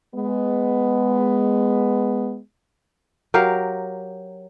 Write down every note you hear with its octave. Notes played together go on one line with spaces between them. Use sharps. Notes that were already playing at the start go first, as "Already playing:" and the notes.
G#3 B3
F#3 G4 A#4 F5